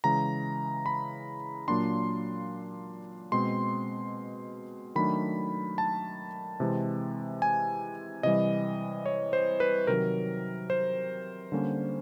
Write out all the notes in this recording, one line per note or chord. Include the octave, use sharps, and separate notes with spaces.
C#3 E3 G#3 A#5
B5
A#2 F#3 A#3 D4 C6
B2 G#3 C4 C6
D#3 F#3 A3 D4 B5
A5
C3 E3 G#3 C4
G#5
C3 E3 G3 D#5
C#5
C5
B4
C3 D#3 F#3 A#4
C5
D3 G3 A#3 C#4